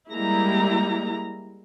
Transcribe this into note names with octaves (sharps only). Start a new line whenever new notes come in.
G3 G#3 A#3 E4 A#5